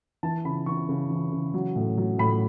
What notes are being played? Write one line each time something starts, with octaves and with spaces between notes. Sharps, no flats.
E3 A5
C#3 B5
E3 C#6
C#3
E3
C#3
F#3
A2
F#3
A2 B5